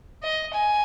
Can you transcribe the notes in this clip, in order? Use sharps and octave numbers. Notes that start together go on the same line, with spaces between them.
D#5
G#5